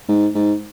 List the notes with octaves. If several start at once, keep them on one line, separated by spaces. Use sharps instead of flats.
G#2
G#2